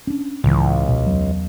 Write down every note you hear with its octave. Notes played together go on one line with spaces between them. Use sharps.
C#4 D4
C#2 A2 C#3 E3
A#1 B2
E2 F#3